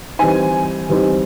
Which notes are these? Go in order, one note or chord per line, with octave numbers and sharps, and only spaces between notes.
E3 G3 C4 D#4 G#5
E3 G3 C4 D#4